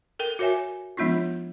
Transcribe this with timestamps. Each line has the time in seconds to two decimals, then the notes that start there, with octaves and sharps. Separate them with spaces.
0.19 A4 A#4 G5
0.39 F#4 A#4 C#5 E5 G#5
0.97 F3 G#3 B3 D4 D#4 F4